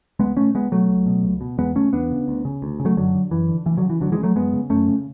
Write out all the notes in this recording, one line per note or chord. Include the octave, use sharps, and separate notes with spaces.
C#2 G#3 B3
B2 A3 C#4
C#2 G#3 B3
B2 F#3 A3
C#2
B2
C#2
B2
E2 G#3 B3
C#3 A3 C#4
E2 B3 D4
C#3
D2
C#3
D2
C#3
F#3 A3
F#2 D3 F#3
D3
F#2 E3
D3
D2 E3
D3 F#3
C#3
E3
D2 D3 F#3
E3 G#3
C#3
F#3 A3
F#2 G#3 B3
C#3
F#2 A3 C#4
C#3